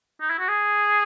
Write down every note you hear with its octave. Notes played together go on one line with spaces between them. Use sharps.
D#4
E4
F#4
G#4